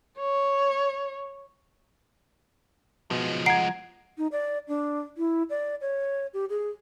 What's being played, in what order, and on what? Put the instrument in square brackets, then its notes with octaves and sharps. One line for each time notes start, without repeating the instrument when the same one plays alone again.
[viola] C#5
[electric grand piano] B2 [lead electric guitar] F3 G#3
[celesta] F#5 D7 [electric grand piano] A#5 G#6 [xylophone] C7
[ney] D#4
D5
D4
E4
D5
C#5
G4
G#4